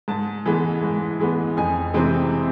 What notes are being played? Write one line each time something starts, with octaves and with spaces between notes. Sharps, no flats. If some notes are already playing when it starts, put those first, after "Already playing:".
G#2 A5
E3 G#3 B3
G#2
E3 G#3 B3
F2 G#5
C3 E3 G#3 C4